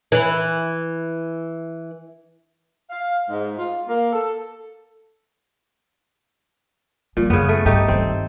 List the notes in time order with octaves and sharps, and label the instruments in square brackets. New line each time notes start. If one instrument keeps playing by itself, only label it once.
[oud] E3 E4
[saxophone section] F5
G#2
F4
A#3
A4
[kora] A#2 [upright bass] F3 G3
[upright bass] F#2 [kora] C#3 B3
[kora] A3
[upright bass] G2 [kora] A3 D#4 G4
[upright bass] G2 D#3 [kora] C4